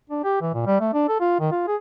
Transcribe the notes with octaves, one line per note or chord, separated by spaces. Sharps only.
D4
G4
E3
A#2
G3
A3
D4
A4
F4
D#3
F4
G#4